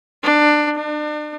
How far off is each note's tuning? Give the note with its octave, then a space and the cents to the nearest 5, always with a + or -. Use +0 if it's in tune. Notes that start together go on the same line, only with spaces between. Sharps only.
D4 +20
D4 +40